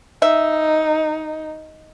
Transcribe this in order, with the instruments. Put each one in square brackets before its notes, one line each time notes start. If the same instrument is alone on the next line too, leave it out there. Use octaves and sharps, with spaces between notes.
[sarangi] D#4 [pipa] E5